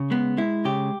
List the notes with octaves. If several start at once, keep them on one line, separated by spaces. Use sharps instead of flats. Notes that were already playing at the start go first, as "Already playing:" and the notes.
Already playing: C#3
G#3 B3
G#3 E4
C#3 G4